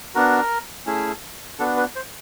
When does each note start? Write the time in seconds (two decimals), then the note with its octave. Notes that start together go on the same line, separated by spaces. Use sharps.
0.15 B3 D4 F#4 A#4
0.86 A3 C#4 E4 G#4
1.59 B3 D4 F#4 A4
1.77 B4
1.96 C5